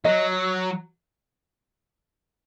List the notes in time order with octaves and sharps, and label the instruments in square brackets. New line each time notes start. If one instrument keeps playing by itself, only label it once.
[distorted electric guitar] F#3 [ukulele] D#5